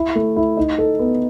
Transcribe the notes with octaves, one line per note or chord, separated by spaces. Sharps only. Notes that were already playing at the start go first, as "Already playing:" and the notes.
Already playing: E4
A3
E4
D#4
A4
B3